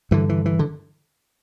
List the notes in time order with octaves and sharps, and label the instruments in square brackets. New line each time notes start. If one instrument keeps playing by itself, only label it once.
[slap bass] G2 D3 E3
E3
E3
D3